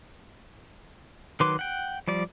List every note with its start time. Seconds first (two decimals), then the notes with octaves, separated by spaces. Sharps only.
1.40 D#3 F#3 B4 C6 D6
1.59 F#5 G5
2.08 F3 G3 D5